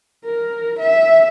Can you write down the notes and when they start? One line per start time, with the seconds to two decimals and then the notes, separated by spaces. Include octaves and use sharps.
0.25 A#4
0.80 E5